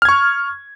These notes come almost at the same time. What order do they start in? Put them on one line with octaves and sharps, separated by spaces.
F6 G#6 C#6